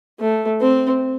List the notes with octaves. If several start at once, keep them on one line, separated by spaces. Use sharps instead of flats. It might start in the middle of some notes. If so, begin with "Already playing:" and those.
A3
C4